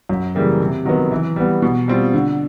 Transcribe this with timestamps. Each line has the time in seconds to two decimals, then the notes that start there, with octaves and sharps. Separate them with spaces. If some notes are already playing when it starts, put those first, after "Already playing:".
0.09 F#2
0.35 C#3 E3 G3 A#3
0.61 C3
0.85 D#3 F#3 B3
1.12 E3
1.36 G3 B3
1.62 B2
1.88 G3 C4 F4
2.13 D3